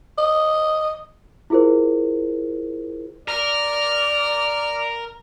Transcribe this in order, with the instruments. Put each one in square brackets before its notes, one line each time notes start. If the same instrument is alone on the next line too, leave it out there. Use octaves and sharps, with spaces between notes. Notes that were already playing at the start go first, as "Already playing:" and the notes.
[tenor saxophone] D#5
[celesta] E4 F4 G#4 A#4 C5
[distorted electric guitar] A#4 [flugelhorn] D5 [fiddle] F6